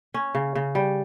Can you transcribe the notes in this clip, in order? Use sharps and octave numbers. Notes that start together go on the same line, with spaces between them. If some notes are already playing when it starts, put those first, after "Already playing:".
C#4
C#3
C#3
G3